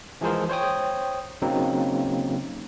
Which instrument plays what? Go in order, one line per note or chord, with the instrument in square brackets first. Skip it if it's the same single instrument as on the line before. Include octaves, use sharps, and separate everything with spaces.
[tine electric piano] E3 F3 G#3 G#4 A#4 C5
C5 C#5 G5 D#6
C#3 F#3 A#3 C4 D#4